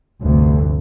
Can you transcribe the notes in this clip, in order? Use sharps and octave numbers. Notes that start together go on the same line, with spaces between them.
F1 D2 G2